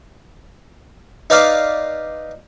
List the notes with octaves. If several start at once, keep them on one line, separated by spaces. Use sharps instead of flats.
D#4 B4 D5 F5